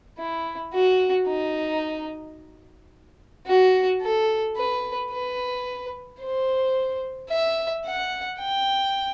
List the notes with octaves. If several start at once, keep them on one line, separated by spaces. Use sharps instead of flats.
E4
F#4
D#4
F#4
A4
B4
B4
C5
E5
F#5
G5